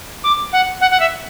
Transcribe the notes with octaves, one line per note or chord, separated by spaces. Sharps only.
D6
F#5
F#5
F#5
E5